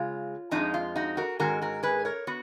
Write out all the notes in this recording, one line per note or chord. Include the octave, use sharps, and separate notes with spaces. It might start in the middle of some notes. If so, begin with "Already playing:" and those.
Already playing: C#3 G#3 F4
F2 F3 G#3 D#4
F4
D#4 F#4
F#4 A#4
G#2 D#3 G#3 C#4 F#4 A#4
F#4 A#4
G#4 B4
A#4 C#5
B3 F#4